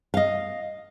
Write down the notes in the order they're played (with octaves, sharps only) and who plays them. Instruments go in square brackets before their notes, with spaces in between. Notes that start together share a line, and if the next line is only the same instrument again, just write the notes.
[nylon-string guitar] D#5 F5